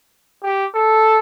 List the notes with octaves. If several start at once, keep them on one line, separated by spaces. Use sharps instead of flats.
G4
A4